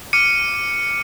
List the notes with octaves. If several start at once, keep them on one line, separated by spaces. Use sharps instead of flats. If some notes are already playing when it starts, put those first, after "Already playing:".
D6 F6 C#7 D#7